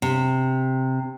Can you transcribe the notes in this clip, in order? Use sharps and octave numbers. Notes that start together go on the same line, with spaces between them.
C3